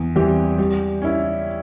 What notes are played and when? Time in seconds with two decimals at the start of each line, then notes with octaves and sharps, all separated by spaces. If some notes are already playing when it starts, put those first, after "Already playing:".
Already playing: E2
0.15 E3 G3 C4 G4
0.58 G3
1.02 C#4 E4